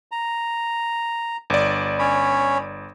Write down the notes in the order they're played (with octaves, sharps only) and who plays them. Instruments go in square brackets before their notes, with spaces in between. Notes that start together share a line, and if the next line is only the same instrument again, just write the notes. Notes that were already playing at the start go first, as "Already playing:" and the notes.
[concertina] A#5
[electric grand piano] G1 D5
[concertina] C#4 C#5 B5